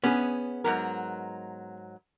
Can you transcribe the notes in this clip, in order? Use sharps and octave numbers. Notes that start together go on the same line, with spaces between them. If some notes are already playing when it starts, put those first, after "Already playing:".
B3 C#4 G#4
G#2 F#3 A#4